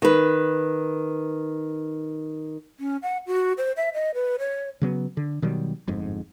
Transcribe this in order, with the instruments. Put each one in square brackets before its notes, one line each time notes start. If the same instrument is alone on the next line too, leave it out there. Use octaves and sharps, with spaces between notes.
[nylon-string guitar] D#3 B4
[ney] C#4
F#5
F#4
C5
E5
D#5
B4
C#5
[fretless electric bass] C#3 F#3 B3
D3
B2 D#3 F#3 G3
G1 F2 G#2